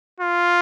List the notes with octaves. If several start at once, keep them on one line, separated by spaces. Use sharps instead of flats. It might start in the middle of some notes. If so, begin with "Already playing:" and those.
F4